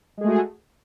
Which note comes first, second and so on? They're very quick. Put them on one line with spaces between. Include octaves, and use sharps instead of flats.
G#3 G#4 A3 F#4